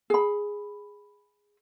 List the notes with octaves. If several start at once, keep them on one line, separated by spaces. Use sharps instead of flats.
G#4 B5